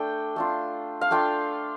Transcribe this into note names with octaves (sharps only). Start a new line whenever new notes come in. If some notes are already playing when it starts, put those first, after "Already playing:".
Already playing: A3 D4 G5
A3 D4 F4
F5
A3 D4 F4 G5